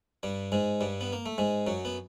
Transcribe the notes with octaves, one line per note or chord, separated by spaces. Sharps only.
G2 G3
G#2 G#3
G2 G3
B3
A#3
A3
G#2 G#3
F#2 F#3
B3